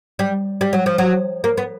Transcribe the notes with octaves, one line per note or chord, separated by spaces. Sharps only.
G3
G3
F#3
F3
F#3
A#3
B3